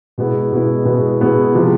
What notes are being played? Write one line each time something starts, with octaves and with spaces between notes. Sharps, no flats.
B2 G#3 B3 E4
B2 G#3 B3 E4
B2 G#3 B3 E4
B2 G#3 B3 E4
C3 F3 G#3